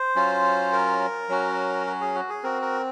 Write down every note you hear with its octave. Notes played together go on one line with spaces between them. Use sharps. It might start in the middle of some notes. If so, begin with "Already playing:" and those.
Already playing: C5
F#3 C#4 F4
A#4
F#3 C#4 F#4
F#4
G#4
F#4
G#4
C4 F#4 A#4
A#4